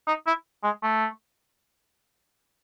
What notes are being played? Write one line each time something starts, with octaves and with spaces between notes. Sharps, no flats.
D#4
E4
G#3
A3